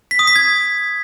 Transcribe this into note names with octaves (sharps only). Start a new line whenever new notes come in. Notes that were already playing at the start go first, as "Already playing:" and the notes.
B6
D#6
B6
G#6